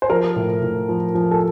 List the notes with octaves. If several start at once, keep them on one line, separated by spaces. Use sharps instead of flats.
C5
F3 A#4
A2
A2
F3
F3
A4